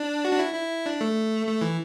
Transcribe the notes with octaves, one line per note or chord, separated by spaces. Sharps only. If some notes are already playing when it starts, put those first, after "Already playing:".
Already playing: D4
F#4
D4
E4
E4
D4
A3
A3
E3